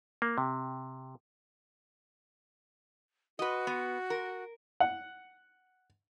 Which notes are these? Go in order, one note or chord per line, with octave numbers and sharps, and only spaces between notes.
A#3
C3
F#4 B4 D#5
B3
A#4
F#5